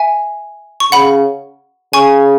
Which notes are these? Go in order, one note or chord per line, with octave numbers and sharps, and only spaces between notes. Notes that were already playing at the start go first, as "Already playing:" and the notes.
Already playing: E5 G#5
C#6
C#3 F#5 B5
C#3 G#5 C#6